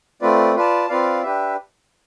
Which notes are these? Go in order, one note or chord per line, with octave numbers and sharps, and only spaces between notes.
A3 C4 F4 B4 D5
F4 B4 D5 A5
C4 F4 B4 D5 F5
D4 G4 B4 E5